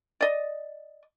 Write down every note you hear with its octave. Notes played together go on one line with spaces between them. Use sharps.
D5 D#5